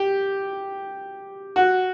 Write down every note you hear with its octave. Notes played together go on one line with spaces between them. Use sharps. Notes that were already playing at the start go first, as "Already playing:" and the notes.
Already playing: G4
F#4